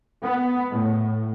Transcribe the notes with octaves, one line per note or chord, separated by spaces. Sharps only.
B3
A2